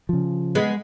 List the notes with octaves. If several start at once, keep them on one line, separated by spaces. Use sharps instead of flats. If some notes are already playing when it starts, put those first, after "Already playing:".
C#3 F3
G#3 B3